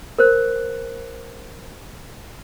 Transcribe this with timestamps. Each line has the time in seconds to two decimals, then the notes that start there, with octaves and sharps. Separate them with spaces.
0.19 A#4 C5 F#6